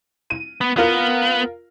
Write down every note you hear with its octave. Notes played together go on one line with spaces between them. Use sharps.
D#7
B3
B3 F4 A#4